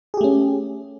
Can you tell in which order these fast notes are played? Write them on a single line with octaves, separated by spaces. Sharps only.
G#4 G4 A3 C#4